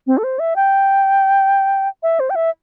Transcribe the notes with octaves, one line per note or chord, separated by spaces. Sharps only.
C4
A4
C5
E5
G5
E5
C5
G5
E5